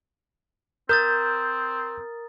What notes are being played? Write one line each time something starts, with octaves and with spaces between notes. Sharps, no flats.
C4 A#4 A#5 D#6 G6 A6